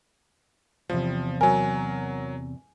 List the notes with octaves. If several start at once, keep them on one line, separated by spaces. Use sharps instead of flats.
E2 C3 F3
F#3 A#4 G#5